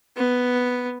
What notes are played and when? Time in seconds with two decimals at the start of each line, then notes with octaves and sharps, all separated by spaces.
0.16 B3